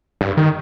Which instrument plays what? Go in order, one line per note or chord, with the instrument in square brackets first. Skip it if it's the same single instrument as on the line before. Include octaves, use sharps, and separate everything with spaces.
[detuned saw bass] G2
D#3